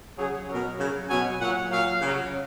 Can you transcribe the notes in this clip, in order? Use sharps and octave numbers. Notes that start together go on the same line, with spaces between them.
C#3 F#3 G#4
B2 F#3 A#4
C#3 F#3
B2 F#3 G#5
A#2 F#3 F#5
A#2 F#3 F5
C#3 F#3